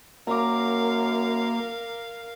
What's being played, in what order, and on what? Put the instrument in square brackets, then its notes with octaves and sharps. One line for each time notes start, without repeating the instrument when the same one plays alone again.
[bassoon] F#2 [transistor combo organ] A#3 [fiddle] A#4 F5 [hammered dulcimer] A#5 D6